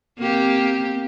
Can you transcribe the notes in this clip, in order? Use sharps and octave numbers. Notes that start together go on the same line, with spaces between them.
A#3 C4 G4